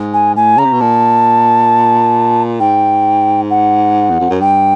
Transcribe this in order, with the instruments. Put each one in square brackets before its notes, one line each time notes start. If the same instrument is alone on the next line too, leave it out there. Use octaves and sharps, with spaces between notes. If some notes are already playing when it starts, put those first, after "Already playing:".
Already playing: [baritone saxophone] G#2
[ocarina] G#5
[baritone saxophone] A2 [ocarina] G#5
[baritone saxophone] C#3 [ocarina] A#5
[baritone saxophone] C3
B2
[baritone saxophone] A#2 [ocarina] A5
[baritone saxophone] G#2 [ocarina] G5
[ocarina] F#5
[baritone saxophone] E2
F2
F#2
[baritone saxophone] G2 [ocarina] G5